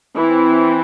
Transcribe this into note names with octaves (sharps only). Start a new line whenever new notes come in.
E3 C4 E4